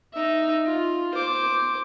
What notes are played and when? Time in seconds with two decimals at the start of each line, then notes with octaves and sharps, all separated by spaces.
0.13 D#4 E5
0.66 F4
1.14 C5 D6